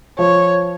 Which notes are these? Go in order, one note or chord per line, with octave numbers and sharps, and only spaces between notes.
F3 C#5